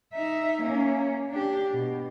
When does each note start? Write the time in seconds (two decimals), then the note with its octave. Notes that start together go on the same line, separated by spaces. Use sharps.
0.13 D#4 E5
0.61 A#3 C#4
1.30 D4 G4
1.74 B2